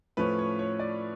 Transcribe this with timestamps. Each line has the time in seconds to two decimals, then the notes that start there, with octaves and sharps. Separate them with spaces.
0.17 A2 F3 A3 C#4 B4
0.39 C#5
0.59 C#5
0.80 D5